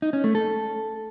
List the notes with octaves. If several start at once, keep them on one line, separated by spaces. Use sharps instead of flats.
D#4
C#4
A3
A4